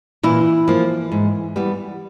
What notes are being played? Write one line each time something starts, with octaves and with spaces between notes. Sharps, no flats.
A#2 E3 E4
F3 A#3
G#2
E3 G3 B3